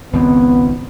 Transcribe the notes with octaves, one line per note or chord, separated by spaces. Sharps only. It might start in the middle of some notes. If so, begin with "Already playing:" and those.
G#1 C#2 B3 C4